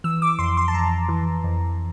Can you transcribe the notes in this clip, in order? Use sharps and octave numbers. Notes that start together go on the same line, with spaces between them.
E3 E6
D6
F2 C6
C6
A5
F2 A#5
E3
F2